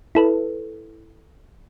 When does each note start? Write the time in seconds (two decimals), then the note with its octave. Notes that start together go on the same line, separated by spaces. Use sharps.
0.15 E4 A4 B4